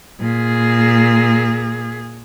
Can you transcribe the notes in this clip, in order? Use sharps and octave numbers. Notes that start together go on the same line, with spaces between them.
A#2 G#4